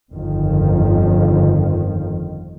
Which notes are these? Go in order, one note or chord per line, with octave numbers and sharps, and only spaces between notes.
G1 F2 D#3 F3